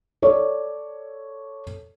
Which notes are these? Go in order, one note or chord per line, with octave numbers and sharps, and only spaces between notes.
A4 C#5 D5